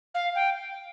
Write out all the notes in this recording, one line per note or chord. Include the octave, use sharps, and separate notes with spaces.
F5
G5